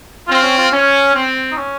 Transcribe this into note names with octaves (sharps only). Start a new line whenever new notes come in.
C4 F4
C#4
F4
C#4
C4
D#4
C#4